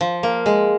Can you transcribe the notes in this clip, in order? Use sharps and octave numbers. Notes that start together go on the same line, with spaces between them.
F3
A#3
G#3